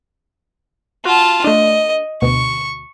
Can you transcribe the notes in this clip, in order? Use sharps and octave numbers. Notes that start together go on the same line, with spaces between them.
F4 F#4 A5
A3 D4 D#5
D2 B2 C#6